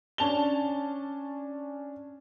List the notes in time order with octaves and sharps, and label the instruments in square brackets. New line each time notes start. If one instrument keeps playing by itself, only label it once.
[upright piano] C#4 D4 A5 F7 G7